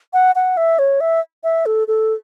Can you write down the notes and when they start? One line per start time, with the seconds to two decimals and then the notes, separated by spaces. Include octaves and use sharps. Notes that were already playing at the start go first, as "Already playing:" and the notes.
0.13 F#5
0.35 F#5
0.57 E5
0.79 C#5
1.01 E5
1.44 E5
1.66 A4
1.88 A4